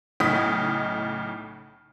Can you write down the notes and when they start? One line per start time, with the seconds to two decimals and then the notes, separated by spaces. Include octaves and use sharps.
0.20 B1 A2 C#3 D#4 D#6 B6